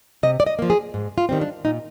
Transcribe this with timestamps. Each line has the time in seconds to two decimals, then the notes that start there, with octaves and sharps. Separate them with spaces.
0.23 C3 D#5
0.40 D5
0.46 D#5
0.59 F3 A#3
0.70 G#4
0.94 G#2
1.18 F4
1.29 D#3 G3 C4
1.41 D4
1.65 A#2 D#4